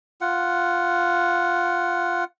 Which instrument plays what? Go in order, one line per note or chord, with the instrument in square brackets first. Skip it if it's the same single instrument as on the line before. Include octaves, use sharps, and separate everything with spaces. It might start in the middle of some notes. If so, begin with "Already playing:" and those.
[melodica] F4 F#5